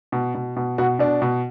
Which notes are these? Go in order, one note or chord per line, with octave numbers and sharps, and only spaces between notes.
B2
B2
B2
B2 F#4
B2 D4
B2